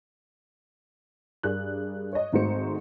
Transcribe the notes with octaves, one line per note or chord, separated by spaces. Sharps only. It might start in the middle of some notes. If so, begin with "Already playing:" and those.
G2 G#4 A#4 D5 F#6
C#5 D#5
G#1 G#2 A3 F#4 C5 C#7